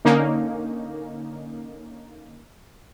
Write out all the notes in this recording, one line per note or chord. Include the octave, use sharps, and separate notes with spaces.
D3 A#3 C#4 D#4